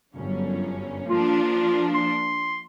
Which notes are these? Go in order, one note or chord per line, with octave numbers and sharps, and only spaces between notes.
G1 F#2 C#4
F3 A#3 D4 F4
C6